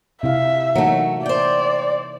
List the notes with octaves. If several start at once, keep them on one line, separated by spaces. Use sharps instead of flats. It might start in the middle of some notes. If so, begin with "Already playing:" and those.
C3 E4 E5 F5
E3 F#3 A3 A#3 D#4
C5 D5 G5